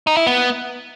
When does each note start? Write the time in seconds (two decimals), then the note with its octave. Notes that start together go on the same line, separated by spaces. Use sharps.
0.07 D#4
0.17 E4
0.27 B3